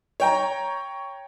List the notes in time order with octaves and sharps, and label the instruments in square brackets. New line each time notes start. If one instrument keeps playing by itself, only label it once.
[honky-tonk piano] C#5 G5 A#5